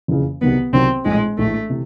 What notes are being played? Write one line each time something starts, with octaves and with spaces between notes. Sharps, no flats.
F#1 F2 C#3 E3
C2 C3 D#3 F#3 B3
C2 C3 D#3 F#3 C4
A#1 A2 E3 G#3
A#1 A2 E3 A3
C3 E3